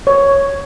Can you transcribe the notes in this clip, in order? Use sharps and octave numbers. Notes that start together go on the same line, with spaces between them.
C#5